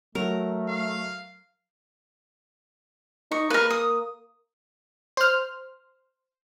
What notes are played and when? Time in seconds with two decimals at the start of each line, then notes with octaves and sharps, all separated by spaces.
0.15 F#3 A3 A#4
0.67 F5
3.32 D#4 C#6
3.50 A#3 A#4 B4
3.70 D#6
5.17 C5 F6